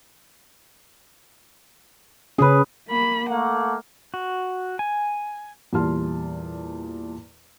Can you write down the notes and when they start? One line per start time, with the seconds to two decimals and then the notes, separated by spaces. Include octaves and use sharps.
2.38 C#3 C#4 G#4 B4
2.89 A#3 B5
3.30 A3 A#3 F#5
4.14 F#4
4.79 G#5
5.73 E2 A#2 G3 A5 C6 F6